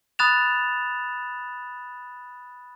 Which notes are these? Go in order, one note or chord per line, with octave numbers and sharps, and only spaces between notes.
B5 D#6 F#6 A6 E7 F7